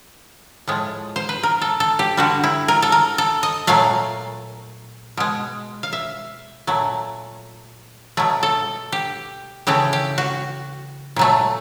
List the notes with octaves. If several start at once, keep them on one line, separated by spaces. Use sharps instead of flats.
A2 F3 G#3
C5
B4
A#4
A4
A4
G4
D3 G3 F#4
E4
A#4
A4
A#4
A4
D#5
A#2 F#3 A3 F5
B2 G#3
F5
E5
A#2 F#3 A3
B2 F#3 A3
A4
G4
C#3 E3 A3 G4
G4
F#4
A#2 F#3 A3